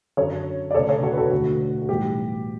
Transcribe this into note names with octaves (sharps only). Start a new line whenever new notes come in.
F#2 D3 F#3 A4 C#5
D5
E1 D2 C#3 A4 C#5
A4 C#5
F#4 A4
B4
F#4 A4
E1 D2 D3 A3 F#4
F#4
B1 A2 E3 G3 G4